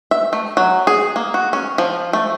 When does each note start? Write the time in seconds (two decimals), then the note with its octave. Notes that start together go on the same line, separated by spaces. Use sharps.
0.11 E5
0.33 A3
0.57 F#3
0.87 G#4
1.16 A#3
1.34 F#4
1.53 C#4
1.78 F3
2.13 A3